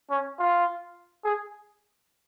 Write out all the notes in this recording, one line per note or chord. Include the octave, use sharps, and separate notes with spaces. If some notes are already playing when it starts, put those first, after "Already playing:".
C#4
F4
G#4